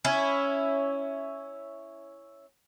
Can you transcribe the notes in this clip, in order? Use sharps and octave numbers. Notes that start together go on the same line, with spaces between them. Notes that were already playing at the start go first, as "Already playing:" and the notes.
C#4 E4